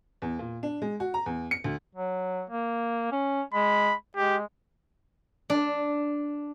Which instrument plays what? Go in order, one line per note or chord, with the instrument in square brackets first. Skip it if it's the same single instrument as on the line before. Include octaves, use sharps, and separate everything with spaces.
[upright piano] E2
A#2
D4
G#3
F#4
A#5
E2
C#7
D2
[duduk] F#3
A#3
C#4
[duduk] G#3 [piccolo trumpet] B5
[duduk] G#3 [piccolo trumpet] G4
[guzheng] D4